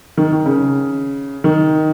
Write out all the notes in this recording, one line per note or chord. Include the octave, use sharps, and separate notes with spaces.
D#3
D#3
C#3
D#3